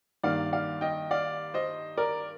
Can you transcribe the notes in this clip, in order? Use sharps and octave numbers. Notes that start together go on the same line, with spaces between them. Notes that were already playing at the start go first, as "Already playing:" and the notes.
G2 D#3 A#3 D5 F5
D5 F5
D#5 G5
D5 F5
C5 D#5
A#4 D5